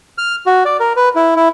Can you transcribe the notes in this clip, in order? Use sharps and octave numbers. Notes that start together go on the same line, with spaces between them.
F6
F#4
D5
A#4
B4
E4
E4